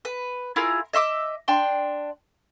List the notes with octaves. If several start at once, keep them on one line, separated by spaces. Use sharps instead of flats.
B4
E4 F4 G#4 A#4
D#5 E5 C6 D6
D4 G5 C6